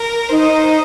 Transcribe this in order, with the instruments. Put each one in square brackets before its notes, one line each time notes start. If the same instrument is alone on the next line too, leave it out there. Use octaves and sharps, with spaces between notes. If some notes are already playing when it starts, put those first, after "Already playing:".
Already playing: [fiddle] A#4
[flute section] D#4 [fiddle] C5